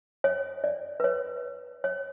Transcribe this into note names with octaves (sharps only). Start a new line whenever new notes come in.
C#5
D5
B4
C#5
C#5